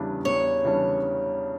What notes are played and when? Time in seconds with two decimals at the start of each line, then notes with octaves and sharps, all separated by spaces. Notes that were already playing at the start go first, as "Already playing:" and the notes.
Already playing: E2 C#3 E3 G3 D4
0.25 E2 C#5
0.65 C#3 E3 G3 D4